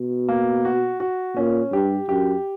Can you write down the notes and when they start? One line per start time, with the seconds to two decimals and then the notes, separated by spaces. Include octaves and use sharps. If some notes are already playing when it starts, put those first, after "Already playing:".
Already playing: B2
0.28 A#3
0.65 F#4
1.00 F#4
1.37 A#2 C#4
1.73 G2 G4
2.09 F#2 G4